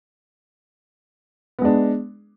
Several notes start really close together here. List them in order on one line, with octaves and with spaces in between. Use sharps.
B3 G#3 D4